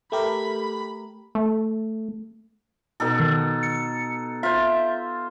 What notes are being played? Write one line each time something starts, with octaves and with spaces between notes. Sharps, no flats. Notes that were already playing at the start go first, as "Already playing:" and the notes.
A3 G4 A#4 B5
A3
B2 D#4 A4
D#3
C#7
F4 C5 E5